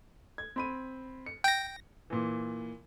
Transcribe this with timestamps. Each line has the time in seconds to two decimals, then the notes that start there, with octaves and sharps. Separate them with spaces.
0.38 G#6
0.56 C4 B5 D#7
1.26 C#7
1.44 G5 A#6
2.10 A#2 E3